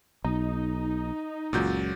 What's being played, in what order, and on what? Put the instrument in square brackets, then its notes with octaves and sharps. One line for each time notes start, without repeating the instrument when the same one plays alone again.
[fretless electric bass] B1 [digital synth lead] D#4
[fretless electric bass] F#1 C#2 [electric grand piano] A#2 F#3 G6